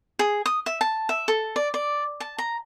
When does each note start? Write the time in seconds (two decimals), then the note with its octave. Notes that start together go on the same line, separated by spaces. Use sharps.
0.19 G#4
0.46 D#6
0.66 E5
0.81 A5
1.09 E5
1.28 A4
1.56 D5
1.74 D5
2.20 A5
2.38 A#5